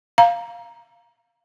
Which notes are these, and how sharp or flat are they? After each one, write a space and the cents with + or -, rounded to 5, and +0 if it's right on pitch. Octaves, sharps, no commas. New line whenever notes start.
F5 +0 A#5 +5